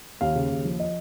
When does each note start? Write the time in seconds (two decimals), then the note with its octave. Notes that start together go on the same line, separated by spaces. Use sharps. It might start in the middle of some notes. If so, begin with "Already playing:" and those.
0.21 D#2 F5
0.36 C#3
0.50 D#2
0.65 F3
0.80 D#5